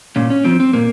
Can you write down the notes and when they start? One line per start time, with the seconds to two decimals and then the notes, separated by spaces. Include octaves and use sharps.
0.16 A#2 C#4
0.30 C#4
0.45 F3 C4
0.60 C4
0.73 A#2 A#3